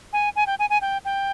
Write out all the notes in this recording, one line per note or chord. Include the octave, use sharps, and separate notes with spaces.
G#5
G#5
G5
G#5
G#5
G5
G5